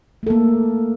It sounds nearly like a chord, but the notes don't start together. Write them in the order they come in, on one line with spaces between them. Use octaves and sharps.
A3 A4 A#3